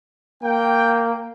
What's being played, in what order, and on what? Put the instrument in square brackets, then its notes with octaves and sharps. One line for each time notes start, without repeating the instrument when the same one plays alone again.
[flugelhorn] A#3 [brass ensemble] G5